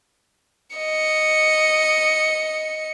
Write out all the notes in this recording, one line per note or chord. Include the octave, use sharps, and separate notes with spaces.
D#5 C#7